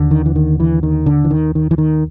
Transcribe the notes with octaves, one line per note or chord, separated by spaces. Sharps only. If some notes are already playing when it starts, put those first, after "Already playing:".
Already playing: D#2 D3
D#3
E3
D#3
E3
D#3
D3
E3
D#3
D#3
E3
D#3